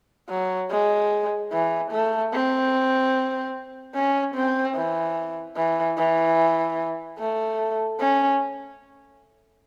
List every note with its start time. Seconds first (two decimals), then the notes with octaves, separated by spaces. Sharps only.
0.30 F#3
0.70 G#3
1.52 E3
1.92 A3
2.32 C4
3.95 C#4
4.35 C4
4.75 E3
5.57 E3
5.97 E3
7.18 A3
8.00 C#4